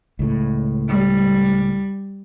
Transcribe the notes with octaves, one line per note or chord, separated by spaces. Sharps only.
C#2 A2
G3